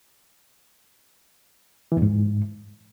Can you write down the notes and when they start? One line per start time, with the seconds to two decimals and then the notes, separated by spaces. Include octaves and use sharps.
1.92 E3
1.97 E2
2.02 G#2